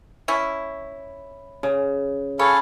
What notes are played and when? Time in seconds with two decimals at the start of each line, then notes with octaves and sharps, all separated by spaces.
0.28 C#4 E4
1.63 C#3
2.39 G#4 A4 C#5 F5 B5